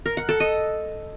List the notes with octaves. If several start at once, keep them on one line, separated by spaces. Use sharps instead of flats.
A#4
F#5
A4
D#5